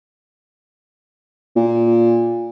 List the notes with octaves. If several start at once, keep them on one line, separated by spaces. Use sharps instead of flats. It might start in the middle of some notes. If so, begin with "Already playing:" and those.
A#2